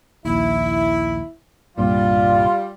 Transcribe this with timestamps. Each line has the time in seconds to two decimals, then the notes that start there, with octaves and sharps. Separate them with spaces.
0.25 A#1 D#2 E4
1.78 C2 G2 A#2 G3 F4